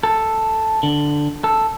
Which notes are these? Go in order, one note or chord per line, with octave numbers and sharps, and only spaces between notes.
A4
D3
A4